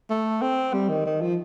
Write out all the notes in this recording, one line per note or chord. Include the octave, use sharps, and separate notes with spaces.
A3
C4
G3
D#3
D#3
F3